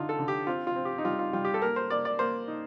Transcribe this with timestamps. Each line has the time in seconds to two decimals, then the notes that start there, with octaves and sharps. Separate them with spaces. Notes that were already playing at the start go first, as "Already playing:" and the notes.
Already playing: D3 D#4 F4
0.09 A4
0.19 D3
0.28 G4
0.47 C4 F4
0.67 F4
0.76 C4
0.85 G4
0.98 D#4
1.04 G3 F4
1.19 F4
1.33 G3 F4
1.45 G4
1.54 A4
1.62 A#3 A#4
1.76 C5
1.90 A#3 D5
2.05 D5
2.19 A#3 C5
2.48 D#4